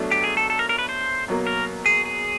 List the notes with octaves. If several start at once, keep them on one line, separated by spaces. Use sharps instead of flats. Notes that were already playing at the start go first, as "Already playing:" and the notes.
Already playing: B2 F#3 A3 D4
G4
G#4
A4
A4
A#4
A#4
B4
C5
B2 F#3 A#3
A#4
G#4
G#4